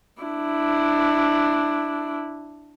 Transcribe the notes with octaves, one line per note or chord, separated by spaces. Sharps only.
D4 E4